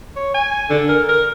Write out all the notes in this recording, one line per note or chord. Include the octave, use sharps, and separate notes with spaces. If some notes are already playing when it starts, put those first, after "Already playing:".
C#5
G#5
D3
A#4
A#4